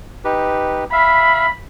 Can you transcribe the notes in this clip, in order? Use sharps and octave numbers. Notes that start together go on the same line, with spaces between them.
D#4 G4 B4
E5 F5 B5